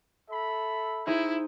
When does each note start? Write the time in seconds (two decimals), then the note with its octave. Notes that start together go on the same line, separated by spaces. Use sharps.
0.30 A4 E5 B5
1.07 D#4 E4 G#4 C5